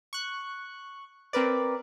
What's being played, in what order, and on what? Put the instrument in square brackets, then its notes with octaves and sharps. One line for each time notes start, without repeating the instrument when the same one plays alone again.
[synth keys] C#6 F#6
C4 A#4 B4 D5